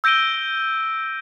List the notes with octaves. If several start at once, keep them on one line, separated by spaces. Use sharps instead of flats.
E6 G6 A#6 D7 D#7 G7